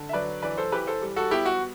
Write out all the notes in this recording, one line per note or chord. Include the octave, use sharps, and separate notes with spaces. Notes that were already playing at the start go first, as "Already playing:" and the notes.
Already playing: D3
E5
F#3 B4 D5
E3 B4 D5
A4 C5
E3 G4 B4
A4 C5
G3
F#4 A4
B3 E4 G4
F#4